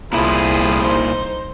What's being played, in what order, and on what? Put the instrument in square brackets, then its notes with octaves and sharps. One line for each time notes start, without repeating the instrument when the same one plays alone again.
[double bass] C2 [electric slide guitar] A#2 E4 [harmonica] F3 G#4 B5
[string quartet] D#4 C5